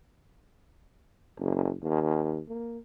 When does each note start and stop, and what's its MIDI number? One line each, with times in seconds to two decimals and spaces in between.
1.39 1.72 30
1.83 2.40 39
2.48 2.79 58